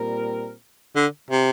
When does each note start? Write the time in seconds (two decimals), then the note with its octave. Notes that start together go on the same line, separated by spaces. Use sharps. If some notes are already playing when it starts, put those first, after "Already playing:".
Already playing: A#2 G3 C4 A#4
0.96 D3
1.30 C3